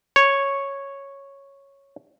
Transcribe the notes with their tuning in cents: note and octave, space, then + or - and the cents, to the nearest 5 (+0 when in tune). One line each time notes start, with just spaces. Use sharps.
C#5 -5